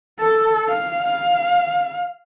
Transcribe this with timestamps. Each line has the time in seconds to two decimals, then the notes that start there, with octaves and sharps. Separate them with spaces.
0.19 A4
0.69 F5
1.09 F5